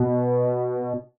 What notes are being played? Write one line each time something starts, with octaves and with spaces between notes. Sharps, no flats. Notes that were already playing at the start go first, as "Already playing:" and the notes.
Already playing: B2